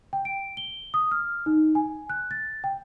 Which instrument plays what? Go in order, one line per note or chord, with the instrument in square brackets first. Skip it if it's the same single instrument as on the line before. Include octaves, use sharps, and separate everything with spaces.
[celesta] G5
D7
G7
D#6
F6
D#4
G#5
F#6
A6
G5